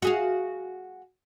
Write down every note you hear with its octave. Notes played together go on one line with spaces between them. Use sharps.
F#4 G#4 F5